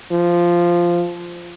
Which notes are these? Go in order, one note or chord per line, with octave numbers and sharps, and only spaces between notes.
F3